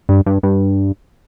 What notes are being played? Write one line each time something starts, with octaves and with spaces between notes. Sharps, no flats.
G2
G2
G2